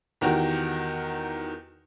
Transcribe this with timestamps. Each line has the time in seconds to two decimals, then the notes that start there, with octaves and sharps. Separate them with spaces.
0.21 E2 D#3 F#4 G4 A#4